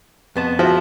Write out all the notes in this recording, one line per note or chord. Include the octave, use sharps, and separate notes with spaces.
F2 B3 A5
F3 F#4 E5